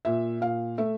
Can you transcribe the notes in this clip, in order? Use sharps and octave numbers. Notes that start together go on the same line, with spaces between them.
A#2 E5
A#2 F5
A3 E5